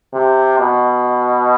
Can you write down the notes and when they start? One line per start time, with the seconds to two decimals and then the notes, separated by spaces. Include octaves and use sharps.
0.14 C3
0.59 B2